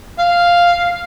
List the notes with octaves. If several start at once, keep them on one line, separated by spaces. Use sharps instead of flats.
F5